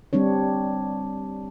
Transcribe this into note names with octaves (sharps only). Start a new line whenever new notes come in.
G3 C4 D4 C#5